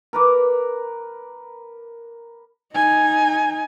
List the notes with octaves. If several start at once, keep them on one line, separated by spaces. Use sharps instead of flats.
A#4 B4 D6
D#4 G#5